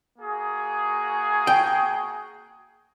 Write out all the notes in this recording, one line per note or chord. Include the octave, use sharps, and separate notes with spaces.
A#3 F#4 G#4
G5